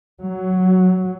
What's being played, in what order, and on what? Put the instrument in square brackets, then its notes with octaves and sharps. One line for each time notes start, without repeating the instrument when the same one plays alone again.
[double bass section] F#3